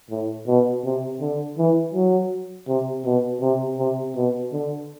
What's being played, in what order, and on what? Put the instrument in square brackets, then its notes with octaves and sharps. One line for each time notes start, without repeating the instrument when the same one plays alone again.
[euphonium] A2
B2
C3
D3
E3
F#3
C3
B2
C3
C3
B2
D3